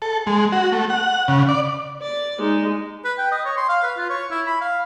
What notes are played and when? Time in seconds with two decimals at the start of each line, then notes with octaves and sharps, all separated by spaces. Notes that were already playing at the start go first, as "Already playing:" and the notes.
0.02 A4
0.27 G#3
0.52 F#4
0.72 A3
0.90 F#5
1.28 C#3
1.49 D5
2.01 D5
2.39 G#3 D#4
3.04 B4
3.18 G5
3.32 D#5
3.45 C#5
3.57 C6
3.68 F5
3.83 B4
3.97 F4
4.10 C#5
4.31 E4
4.46 B5
4.61 F5